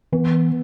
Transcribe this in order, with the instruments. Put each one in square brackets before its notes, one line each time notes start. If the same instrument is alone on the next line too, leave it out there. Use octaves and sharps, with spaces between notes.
[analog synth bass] E3 [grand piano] B3